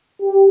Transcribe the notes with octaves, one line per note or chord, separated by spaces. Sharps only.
G4